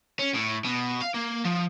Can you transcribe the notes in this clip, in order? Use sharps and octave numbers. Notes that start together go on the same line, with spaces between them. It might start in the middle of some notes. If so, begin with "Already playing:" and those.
C#4
A2
B2
F5
A#3
F3